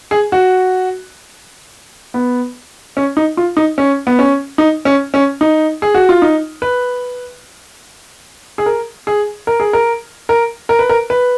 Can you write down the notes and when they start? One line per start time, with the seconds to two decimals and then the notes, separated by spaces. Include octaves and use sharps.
0.11 G#4
0.32 F#4
2.14 B3
2.97 C#4
3.17 D#4
3.37 F4
3.57 D#4
3.78 C#4
4.07 B3
4.19 C#4
4.58 D#4
4.85 C#4
5.14 C#4
5.41 D#4
5.82 G#4
5.94 F#4
6.09 F4
6.22 D#4
6.62 B4
8.58 G#4
8.66 A#4
9.07 G#4
9.47 A#4
9.60 G#4
9.73 A#4
10.29 A#4
10.69 A#4
10.79 B4
10.89 A#4
11.10 B4